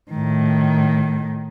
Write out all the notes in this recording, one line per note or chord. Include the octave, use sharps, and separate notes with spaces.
A2 D#3